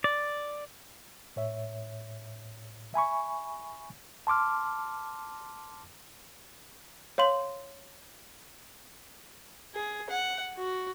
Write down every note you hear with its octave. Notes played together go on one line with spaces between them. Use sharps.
D5
A2 C#5 E5
E5 G#5 B5 C#6
A5 C6 D6 F6
C#5 F5 C6 F#7
G#4
F#5
F#4